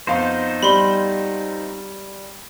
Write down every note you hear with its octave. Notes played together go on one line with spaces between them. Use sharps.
F2 B3 D#4 C5 F5
G3 B5 C6